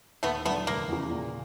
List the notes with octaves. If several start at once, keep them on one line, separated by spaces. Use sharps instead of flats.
D#2 A3 B3
D3 F#3 A3 B3
F1 A#3
E2 C#3
A#2